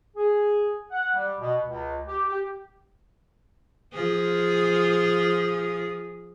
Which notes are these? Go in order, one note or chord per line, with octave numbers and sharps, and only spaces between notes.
G#4
F#5
G3
B2
C#2
G4
G4
F3 G#4